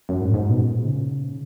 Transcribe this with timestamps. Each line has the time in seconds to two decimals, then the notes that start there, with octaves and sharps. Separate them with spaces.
0.09 F#2
0.21 G#2
0.30 A#2
0.34 G#2
0.49 B2
0.59 A#2
0.84 C#3